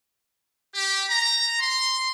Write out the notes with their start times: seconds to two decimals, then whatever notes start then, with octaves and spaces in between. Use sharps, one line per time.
0.73 G4
1.08 A#5
1.61 C6